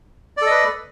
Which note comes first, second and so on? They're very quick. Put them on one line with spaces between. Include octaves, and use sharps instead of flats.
D5 A4 D#5 B4